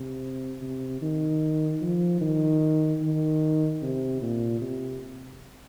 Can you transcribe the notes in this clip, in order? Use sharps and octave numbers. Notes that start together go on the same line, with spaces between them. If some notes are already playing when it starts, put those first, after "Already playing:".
Already playing: C3
C3
D#3
F3
D#3
D#3
C3
A#2
C3